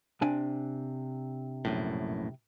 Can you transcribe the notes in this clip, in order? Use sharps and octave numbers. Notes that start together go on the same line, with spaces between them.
C3 D4 G#5
A#1 F#2 A2